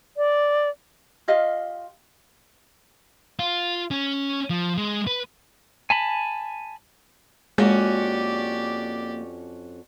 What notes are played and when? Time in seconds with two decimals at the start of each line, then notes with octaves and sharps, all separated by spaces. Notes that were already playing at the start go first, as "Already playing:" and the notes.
0.17 D5
1.28 F4 G4 D#5 F5
3.39 F4
3.91 C#4
4.50 F3
4.77 G#3
5.07 B4
5.90 G#5 A5 B5
7.58 F2 G#3 A#3 C#4 F#4 G4 D5